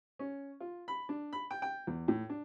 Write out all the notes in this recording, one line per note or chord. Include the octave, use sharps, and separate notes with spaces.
C#4
F4
B5
D4
B5
G5
G5
E2
A2
D4